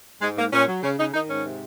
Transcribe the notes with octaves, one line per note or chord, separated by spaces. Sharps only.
G#2 G#3
G#2 A#3
A#2 C#4
F#3
C#3 C#4
C#3 D#4
D#3 D#4
G#2 C#4
C3